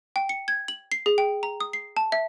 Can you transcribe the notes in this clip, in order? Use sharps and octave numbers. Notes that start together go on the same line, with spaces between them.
G5
C#7
G#6
F#7
C7
G#4
G5
A#5
D#6
C7
A5
E5